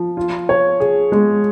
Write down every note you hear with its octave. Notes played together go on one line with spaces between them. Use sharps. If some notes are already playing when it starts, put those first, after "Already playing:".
Already playing: F3
F4
C#5
G#4
G#3